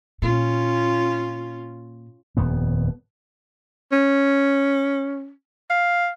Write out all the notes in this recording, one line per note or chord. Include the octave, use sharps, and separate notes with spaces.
A#2 C#4 F4
D#1 F2 B3
C#4
F5